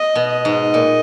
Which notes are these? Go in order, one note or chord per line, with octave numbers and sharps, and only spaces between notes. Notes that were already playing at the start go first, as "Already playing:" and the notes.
Already playing: D#5
B2
D#5
G#2
A#2